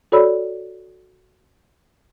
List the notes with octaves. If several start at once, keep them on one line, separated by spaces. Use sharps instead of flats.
F#4 A4 C#5 D5 B5 E6